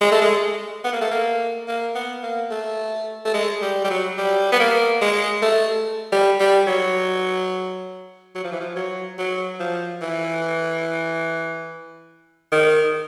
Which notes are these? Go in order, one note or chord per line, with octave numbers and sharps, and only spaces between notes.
G#3
A3
G#3
B3
A#3
A3
A#3
A#3
B3
A#3
A3
A3
G#3
G3
G3
F#3
G3
B3
A#3
G#3
A3
G3
G3
F#3
F#3
F3
E3
F3
F#3
F#3
F3
E3
D#3